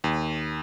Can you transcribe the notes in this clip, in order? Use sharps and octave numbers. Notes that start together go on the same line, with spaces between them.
D#2